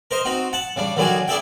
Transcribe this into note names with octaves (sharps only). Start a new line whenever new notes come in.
A#4 C5 D#5
C4 D#4 F#4
F#5 A5
C#3 G3 D4
D3 D#3 F#3 G3 F#4 G#4
D4 E4 G#4 A4 E5 G5